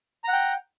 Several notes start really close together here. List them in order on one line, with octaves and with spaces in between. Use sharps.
A#5 F#5 G5